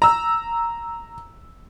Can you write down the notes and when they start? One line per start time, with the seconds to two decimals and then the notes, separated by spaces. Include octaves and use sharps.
0.02 A#5 E6